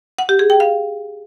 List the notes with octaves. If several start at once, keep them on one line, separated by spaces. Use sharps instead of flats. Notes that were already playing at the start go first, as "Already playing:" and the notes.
F#5
G4
G#4
G5
F5